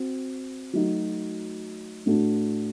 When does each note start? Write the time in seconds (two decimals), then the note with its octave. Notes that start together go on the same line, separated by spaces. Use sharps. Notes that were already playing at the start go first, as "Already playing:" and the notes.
Already playing: C4 F#4
0.73 F#3 A3 D#4 F#4
2.06 A2 A3 D4 F#4